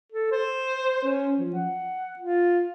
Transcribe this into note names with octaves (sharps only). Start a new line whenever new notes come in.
A4
C5
C#4
F3
F#5
F4